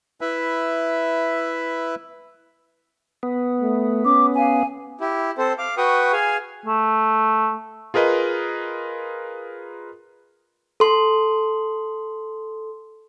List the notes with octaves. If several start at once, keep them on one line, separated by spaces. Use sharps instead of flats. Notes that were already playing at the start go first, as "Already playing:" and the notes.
E4 B4 E5
B3
A3
C#4 D6
F5 G#5
E4 G4
C4 A4 C5
F5 D6
F#4 B4 G5 C#6 D#6
G#4 F5 G#5
A3
F4 G#4 A#4 B4 D#5
A4 C6